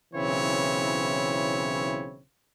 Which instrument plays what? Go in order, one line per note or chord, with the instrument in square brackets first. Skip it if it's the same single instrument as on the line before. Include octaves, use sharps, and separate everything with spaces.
[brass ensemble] B1 C#3 E3 C4 E4 C#5